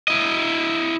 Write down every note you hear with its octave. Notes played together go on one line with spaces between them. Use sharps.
E4 D#5